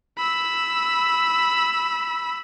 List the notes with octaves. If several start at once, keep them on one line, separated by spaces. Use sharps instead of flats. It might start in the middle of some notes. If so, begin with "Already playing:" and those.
B5 E6